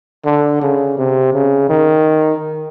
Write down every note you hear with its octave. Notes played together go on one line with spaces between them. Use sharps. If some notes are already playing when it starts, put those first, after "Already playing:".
D3
C#3
C3
C#3
D#3